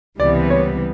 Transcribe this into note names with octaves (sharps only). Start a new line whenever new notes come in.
C#2 C3 E3 G3 B3 D5
C#5